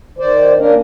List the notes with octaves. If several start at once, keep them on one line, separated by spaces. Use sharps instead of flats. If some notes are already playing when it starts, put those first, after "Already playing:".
D#3 C5 D5
A#3 C#4 D4 A#4